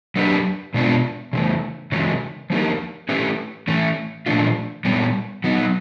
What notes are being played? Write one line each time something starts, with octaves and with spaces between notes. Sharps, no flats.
F#3 A#3 D4 G4 B4
B2 G#3 B3 D4 F4
C#3 E3 A3
C#3 E3 G#3 C#4 F#4
F3 A#3 D#4 G4 A#4
A3 C#4 E4 G4 B4
E3 A3 C#4
A#2 F3 A3 D4 F4
A#2 G3 B3
F#3 B3 D#4